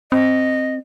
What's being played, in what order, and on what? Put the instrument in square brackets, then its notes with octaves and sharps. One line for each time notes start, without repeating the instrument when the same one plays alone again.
[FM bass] C4 [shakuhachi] D#5